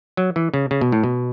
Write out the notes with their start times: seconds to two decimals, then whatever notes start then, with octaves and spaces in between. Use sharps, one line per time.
0.17 F#3
0.36 E3
0.54 C#3
0.71 C#3
0.81 B2
0.92 A2
1.04 B2